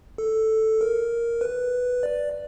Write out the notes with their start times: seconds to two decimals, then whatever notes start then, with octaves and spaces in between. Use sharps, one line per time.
0.18 A4
0.81 A#4
1.41 B4
2.03 D5